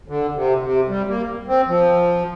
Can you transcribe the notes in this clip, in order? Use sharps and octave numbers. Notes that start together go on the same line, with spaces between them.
D3
C3
C3
G3
A#3
C4
F3